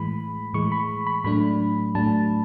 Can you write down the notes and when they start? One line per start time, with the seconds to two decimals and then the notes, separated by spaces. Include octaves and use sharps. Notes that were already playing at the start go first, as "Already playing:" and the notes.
Already playing: A2 E3 G#3 B5
0.53 A2 E3 G#3 C#6
0.72 B5
1.07 B5
1.24 A2 F#3 A3 D4 B5
1.95 A2 F#3 A3 D4 A5